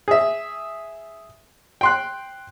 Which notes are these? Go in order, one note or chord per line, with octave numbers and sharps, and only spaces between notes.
G#4 E5
G5 C6 F#6